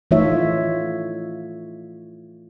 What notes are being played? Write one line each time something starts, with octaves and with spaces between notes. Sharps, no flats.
E3 A3 D#4 F4 C#5 E5